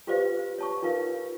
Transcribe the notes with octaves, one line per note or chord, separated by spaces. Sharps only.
F4 G4 B4 C5 D5 F5
C#5 A5 C#6
D#4 F4 A#4 B4 F5